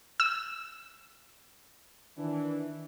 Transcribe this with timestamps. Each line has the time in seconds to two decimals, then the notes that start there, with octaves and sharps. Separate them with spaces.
0.20 E6
2.18 D#3 E3 D4